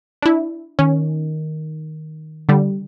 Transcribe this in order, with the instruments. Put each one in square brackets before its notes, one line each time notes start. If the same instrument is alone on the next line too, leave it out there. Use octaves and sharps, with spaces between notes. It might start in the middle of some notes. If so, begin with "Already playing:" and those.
[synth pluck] D4 E4
[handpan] D#3 [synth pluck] C#4
[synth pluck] D3 G3